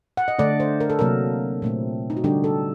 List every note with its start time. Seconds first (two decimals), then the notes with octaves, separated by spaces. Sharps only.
0.17 F#5
0.28 D#5
0.39 D3 A3 D4 D5
0.60 C5
0.80 A#4
0.90 A4
0.99 C3 F#3 A#3 A#4
1.62 A#2 A3 C4
2.10 D#4
2.17 F#4
2.24 D3 G3 D4 G4
2.44 A4